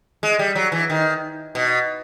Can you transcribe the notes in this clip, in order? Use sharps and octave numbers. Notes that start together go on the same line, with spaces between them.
G#3
G3
F#3
E3
D#3
B2